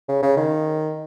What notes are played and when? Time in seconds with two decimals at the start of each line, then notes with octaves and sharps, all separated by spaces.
0.09 C#3
0.22 C#3
0.37 D#3